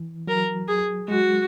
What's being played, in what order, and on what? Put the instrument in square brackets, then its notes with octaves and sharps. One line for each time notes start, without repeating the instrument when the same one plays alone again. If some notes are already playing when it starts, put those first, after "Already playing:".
Already playing: [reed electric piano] E3
[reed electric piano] F#3 [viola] A#4
[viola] G#4
[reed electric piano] G#3 [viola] F#4